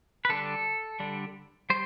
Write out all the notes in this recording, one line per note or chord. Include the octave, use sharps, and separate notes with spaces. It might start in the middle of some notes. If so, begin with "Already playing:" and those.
B4
D3 G3 D4 A4
D3 G3 D4
G3 C5